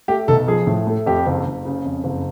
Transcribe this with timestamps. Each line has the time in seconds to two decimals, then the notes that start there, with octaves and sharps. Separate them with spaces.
0.08 A3 G4
0.28 B1 A4
0.48 F3 G#4
0.67 A2
0.87 A3
1.06 F2 G4
1.26 F#1
1.45 F#1
1.65 C#3
1.85 F2
2.04 F#1